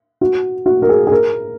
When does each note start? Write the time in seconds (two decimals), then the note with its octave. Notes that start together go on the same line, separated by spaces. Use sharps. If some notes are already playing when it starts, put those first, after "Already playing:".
0.21 F#4
0.66 F#4
0.82 A#4
0.89 G#4
1.07 G#4
1.12 A#4